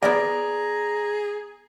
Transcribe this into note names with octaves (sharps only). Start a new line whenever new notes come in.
B3 E4 G#4 A#4 D5 A#5